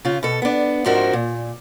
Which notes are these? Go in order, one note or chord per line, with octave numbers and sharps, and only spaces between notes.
C#3 F4
B2 A4
B3 D4
G#2 F3 C4 D4 F#4 A#4
A#2